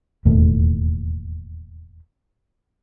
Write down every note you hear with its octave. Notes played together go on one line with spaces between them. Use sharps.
E1 D#2 A2 A3